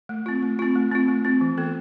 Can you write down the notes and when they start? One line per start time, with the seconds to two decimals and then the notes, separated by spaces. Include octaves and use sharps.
0.09 A3
0.26 C4 F4
0.43 A3
0.59 C4 F4
0.75 A3
0.92 C4 F4
1.08 A3
1.25 C4 F4
1.41 E3
1.58 B3 F4 A4